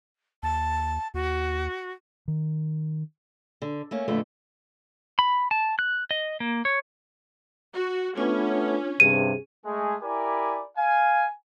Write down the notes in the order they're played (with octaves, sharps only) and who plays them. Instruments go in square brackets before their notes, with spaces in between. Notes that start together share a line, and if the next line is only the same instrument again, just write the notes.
[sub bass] D#2 [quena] A5
[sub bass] D#2 [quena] F#4
[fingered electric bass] D#3
[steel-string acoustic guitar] D3
A3 A#3 C#4
F2 A#2 D3 A3 B3
[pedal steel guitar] B5
A5
F#6
D#5
A#3
C#5
[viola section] F#4
[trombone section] A3 B3 [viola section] C#4 [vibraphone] D4 F4
[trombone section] G2 C3 [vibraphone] G#4 [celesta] D#7
[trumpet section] G#3 A3 G#4
E4 G4 A#4 D5 G#5 B5
F5 G#5